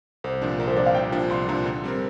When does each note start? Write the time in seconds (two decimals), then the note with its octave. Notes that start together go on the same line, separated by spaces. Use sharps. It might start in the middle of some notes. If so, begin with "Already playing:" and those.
0.24 C2 C5
0.42 A#2 F3 D4
0.59 C2 A#4
0.67 C5
0.76 A#2 F3 D4 D5
0.86 F5
0.94 C2 G5
1.12 A#2 F3 D4
1.30 C2 C6
1.48 A#2 F3 D4 A#5
1.65 D3
1.84 G3 C4 A#4